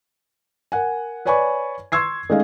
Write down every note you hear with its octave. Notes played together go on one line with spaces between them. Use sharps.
A#4 F#5 G#5
B4 C#5 D5 G#5 B5 C#6
C6 C#6 E6 G#6 C7
G#3 A3 C#4 D#4 F5